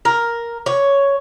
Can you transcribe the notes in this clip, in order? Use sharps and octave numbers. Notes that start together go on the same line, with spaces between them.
A#4
C#5